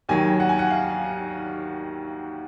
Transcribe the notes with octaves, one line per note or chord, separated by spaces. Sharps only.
D#2 D#3 F#3 G#5
F#5
G#5
F#5
F5